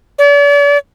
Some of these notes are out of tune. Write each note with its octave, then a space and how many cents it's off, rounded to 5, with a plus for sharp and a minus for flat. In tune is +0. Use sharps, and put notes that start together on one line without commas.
D5 -45